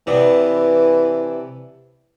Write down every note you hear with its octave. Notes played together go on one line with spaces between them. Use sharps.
C3 E3 B3 D4